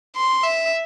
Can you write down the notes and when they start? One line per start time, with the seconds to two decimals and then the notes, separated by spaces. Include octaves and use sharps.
0.15 C6
0.43 E5